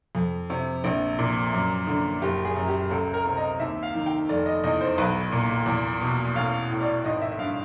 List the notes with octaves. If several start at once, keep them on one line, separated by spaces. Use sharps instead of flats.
F2
C3
A#1
A#2
F#2
D3
F#1 G4
G#4
F#2
G4
C#2 A4
A#4
C3
D#5
D#2 E5
F5
D#3
G5
F1 D5
D#5
E2 D#5
C5
B1 B4
A#2
E2
B2
A1 F5
A2
D5
G#1 D#5
E5
G2 F5